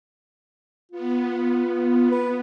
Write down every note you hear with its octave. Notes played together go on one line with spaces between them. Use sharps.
B3 F4
B4